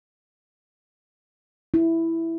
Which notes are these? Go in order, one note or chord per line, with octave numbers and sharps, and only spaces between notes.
E4